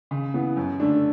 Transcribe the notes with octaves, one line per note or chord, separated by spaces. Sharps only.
C#3
E3 B3
F#2
D3 A3 D4